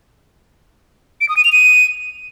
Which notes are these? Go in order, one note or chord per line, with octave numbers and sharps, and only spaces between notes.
D7
D#6
D#7
F7
D#7